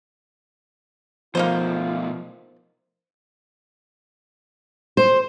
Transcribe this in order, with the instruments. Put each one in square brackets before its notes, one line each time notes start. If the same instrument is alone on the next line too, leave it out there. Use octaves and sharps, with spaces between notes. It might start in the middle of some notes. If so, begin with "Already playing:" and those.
[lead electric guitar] B2 A3 [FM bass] F3 [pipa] A#3 D#4 C5 [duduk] F4
[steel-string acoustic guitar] C5